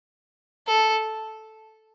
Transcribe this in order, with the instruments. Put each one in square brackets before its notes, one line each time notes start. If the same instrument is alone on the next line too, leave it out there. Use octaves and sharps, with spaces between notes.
[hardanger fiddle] A4